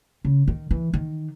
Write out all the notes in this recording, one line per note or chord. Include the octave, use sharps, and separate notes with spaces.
C#3
D#3
E3
D#3